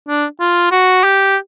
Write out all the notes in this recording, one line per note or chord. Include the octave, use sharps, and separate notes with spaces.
D4
F4
F#4
G4